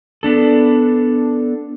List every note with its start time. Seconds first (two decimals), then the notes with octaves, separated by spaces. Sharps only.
0.23 B3 D4 A4